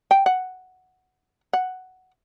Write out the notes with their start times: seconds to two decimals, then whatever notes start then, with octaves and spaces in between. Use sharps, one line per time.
0.11 G5
0.26 F#5
1.53 F#5